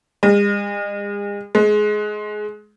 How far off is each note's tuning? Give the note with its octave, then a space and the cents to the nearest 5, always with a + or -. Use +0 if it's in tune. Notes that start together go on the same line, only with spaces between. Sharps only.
G#3 -40
G#3 +20